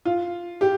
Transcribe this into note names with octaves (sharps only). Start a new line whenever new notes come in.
F4
G4